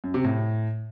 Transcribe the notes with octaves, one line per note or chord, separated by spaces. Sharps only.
F#2
C3
A2